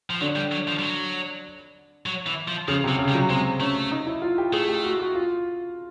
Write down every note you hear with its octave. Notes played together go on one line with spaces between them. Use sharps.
F3
D3 F#3
G3
F#3
F3
G3
F#3
F#3
E3
F3
C#3 F3
C3
F#3
C#3
G3
F#3
G#3 C4
A3 C#4
D#4
E4
F4
G4
A3 G#4
G4
F#4
F#4
F4